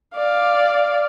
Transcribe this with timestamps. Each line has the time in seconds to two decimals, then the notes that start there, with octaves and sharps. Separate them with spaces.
0.16 D5 F5